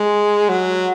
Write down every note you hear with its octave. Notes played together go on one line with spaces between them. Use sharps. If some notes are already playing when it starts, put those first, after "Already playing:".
Already playing: G#3
F#3